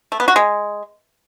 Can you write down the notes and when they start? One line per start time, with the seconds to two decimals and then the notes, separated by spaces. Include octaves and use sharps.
0.12 A3
0.20 B3
0.28 F#4
0.36 G#3